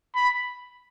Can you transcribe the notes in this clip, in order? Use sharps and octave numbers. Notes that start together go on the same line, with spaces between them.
B5